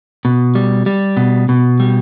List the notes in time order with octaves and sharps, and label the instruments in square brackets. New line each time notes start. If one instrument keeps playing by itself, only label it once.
[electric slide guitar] B2
G3
G3
B2
B2
G3